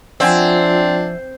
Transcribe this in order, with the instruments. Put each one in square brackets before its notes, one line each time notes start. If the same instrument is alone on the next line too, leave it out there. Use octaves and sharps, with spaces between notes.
[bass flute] F3 [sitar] C4 [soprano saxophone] D4 [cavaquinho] E5 F#5 G#5